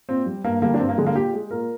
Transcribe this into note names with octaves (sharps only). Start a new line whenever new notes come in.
A#2 C4
G3
G2 A#3
D3 G3 A#3
D4
G2 C4
A#3
D3 G3 G#3
A#3
A#2 G4
G#3
A#2 A#4